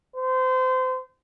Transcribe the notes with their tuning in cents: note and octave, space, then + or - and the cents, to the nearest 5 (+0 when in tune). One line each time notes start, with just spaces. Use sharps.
C5 -30